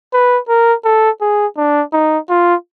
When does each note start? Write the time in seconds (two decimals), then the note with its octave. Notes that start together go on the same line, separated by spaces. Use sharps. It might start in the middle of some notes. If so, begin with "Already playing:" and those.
0.13 B4
0.48 A#4
0.85 A4
1.21 G#4
1.57 D4
1.93 D#4
2.29 F4